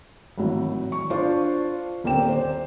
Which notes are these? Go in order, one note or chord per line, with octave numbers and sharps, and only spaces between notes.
G#1 A2 E3 F#3
C#6
D4 F4 A4 C5 D5 C#6
D#1 A#3 C4 D5 G5 E7
C5 D5